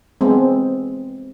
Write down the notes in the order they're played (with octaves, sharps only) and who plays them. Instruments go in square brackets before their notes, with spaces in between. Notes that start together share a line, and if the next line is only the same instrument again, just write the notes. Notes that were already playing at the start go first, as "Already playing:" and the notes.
[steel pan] G#3 B3 C4